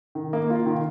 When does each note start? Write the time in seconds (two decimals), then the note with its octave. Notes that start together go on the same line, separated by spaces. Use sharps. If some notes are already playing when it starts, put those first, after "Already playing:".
0.15 D#3
0.33 A#3
0.50 F4
0.66 D#3